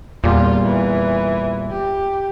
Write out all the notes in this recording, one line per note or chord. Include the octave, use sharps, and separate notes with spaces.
E2 A#2 G3 F4
E3
G4